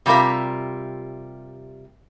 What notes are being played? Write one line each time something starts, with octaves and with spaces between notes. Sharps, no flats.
C3 G3 F4 A#4 E5